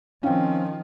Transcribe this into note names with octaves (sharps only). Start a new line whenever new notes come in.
D#3 F3 C4 C#4 E4 F5 G5